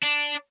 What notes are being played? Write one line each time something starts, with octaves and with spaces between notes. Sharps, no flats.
D4